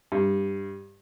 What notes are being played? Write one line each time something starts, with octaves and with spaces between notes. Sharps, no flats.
G2